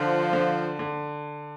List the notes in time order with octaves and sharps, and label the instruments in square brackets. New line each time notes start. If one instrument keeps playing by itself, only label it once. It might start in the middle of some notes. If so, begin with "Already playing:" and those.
Already playing: [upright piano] D3 [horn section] F3
[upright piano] D3
D3